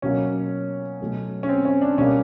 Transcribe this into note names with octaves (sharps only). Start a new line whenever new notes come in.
B2 F#3 A#3 C#4
B2 F#3 A3
C#4
C4
C#4
D4
B2 G3 A#3 C#4